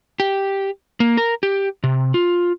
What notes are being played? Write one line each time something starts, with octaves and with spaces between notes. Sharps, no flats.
G4
A#3
A#4
G4
C3
F4